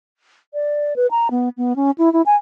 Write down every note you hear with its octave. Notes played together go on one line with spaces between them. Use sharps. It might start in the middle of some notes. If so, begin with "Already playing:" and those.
D5
B4
A#5
B3
B3
C#4
E4
E4
G#5